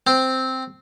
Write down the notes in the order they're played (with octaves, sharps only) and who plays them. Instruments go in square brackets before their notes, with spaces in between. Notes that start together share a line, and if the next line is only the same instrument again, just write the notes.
[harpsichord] C4